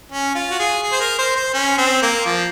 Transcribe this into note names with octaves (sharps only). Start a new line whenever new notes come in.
C#4
F4
F#4
G#4
G#4
C5
A#4
C5
C5
C#4
C4
A#3
F3